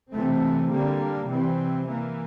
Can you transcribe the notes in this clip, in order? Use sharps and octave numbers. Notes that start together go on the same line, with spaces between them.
C3 E3 A3 C4
D3 G3 A#3
C3 E3 G3 C4
E3 A#3